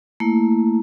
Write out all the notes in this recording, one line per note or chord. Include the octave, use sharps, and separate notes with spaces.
A3 A#3 E4